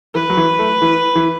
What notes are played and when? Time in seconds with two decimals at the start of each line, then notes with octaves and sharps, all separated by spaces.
0.15 E3 B4
0.30 F#3
0.37 E3
0.59 A3
0.82 E3
1.15 E3